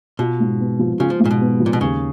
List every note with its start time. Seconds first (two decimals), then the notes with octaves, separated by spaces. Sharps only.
0.19 B2 F4
0.40 G#2
0.60 B3
0.79 F3
1.00 C#3 F4
1.10 F3
1.20 G#2
1.25 A#2
1.31 B2
1.41 B3
1.60 F3
1.66 A#2
1.73 B2
1.81 D#2 C#3